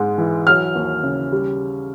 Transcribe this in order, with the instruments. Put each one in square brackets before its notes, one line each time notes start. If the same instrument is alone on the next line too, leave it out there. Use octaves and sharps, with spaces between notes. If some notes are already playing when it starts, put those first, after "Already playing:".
Already playing: [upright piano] G#2 G#3
E3
F#3 F6
D#2
C#3
G3